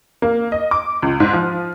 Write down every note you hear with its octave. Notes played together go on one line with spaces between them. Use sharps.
A#3
D#5
D6
C#2
G#2
F3